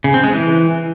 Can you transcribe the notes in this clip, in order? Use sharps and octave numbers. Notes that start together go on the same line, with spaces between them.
C#3
C4
G#3
E3